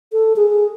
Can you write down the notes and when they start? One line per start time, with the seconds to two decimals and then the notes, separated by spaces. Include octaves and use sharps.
0.13 A4
0.36 G#4